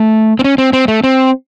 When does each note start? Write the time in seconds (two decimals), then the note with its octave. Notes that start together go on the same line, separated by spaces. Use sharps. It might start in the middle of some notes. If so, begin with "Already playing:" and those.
Already playing: A3
0.39 C4
0.44 C#4
0.58 C4
0.73 C4
0.88 A3
1.04 C4